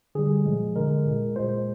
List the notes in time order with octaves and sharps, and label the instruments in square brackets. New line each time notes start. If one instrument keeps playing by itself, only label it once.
[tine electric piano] D3 G3 G#4
A#2 F3 G#3
D3 G#3 A#4
A#2 G#3
A#2 G#3 C5